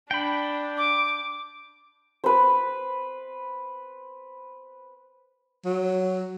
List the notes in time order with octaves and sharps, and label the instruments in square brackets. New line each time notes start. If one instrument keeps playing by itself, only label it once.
[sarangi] D4 [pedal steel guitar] G5 B5
[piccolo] D6
[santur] B4 C5
[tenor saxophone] F#3